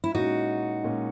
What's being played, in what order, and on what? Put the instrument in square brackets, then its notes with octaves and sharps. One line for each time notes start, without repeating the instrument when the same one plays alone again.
[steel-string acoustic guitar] E4
[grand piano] A#2 G#3 C#4 [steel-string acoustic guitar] D#4 F#4
[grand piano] A#2 G#3 C#4